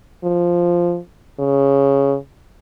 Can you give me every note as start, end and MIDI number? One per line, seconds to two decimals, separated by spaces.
0.24 0.99 53
1.40 2.15 49